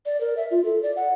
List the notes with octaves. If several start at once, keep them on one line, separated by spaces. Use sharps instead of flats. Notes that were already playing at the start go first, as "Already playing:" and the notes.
D5
A#4
E5
F4
A4
D5
F#5